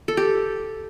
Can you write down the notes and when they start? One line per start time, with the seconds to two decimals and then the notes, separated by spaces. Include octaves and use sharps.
0.08 A4
0.17 G4